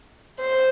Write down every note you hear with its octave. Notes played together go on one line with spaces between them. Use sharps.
C5